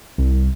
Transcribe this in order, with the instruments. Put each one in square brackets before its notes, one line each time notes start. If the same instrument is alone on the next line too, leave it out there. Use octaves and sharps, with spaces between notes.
[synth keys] C2